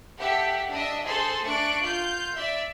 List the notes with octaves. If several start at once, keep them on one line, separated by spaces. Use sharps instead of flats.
G4 A4 E5 F#5
D4 D#5 E5
G#4 A4 C5 A5 C6
A3 D4 C#6 F#6 D7
F4 G6
D5 E5